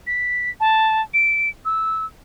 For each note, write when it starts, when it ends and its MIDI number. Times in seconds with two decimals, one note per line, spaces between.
0.07 0.50 95
0.60 1.02 81
1.14 1.49 98
1.65 2.06 88